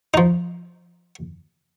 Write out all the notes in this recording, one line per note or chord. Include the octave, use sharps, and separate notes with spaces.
F3 D#4